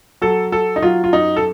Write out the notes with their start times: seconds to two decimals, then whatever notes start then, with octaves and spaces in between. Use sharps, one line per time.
0.22 F#3 A4
0.52 F#3 A4
0.76 D#4
0.82 F#3 F4
1.04 F4
1.13 F#2 D#4
1.36 A4